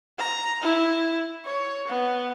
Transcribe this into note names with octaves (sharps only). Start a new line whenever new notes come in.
A#5
E4
C#5
B3